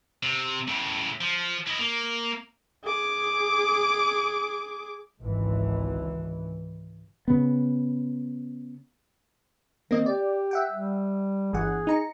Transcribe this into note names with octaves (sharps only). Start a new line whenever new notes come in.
C3
A2 C#3
F3
E4 D#5
A#3
G#4 D6
G#1 C#2 E3
C#3 B3
D#3 A#3 C4 D#5
G4 D5
E5 F#5 G5
G3
G1 E3 G#4 F#5
D#4 A#5 C#7